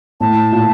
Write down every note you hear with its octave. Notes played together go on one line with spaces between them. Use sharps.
A2 A5
A#2